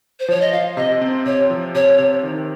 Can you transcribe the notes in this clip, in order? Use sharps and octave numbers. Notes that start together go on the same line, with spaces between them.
C5
F3 C#5
D#5
F3 F5
C3 D#5
C4
C3 C#5
F3
C3 C#5
C3
D#3